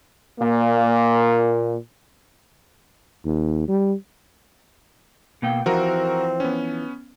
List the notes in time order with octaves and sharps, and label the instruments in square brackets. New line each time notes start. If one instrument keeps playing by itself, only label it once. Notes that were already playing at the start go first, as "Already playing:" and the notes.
[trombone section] A#2 A#3
[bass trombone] D#2
G3
[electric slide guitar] B2 A#3 G5
[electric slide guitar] E3 F3 [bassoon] C4 [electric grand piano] F#4 A#4 A#5
[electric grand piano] B3 C#4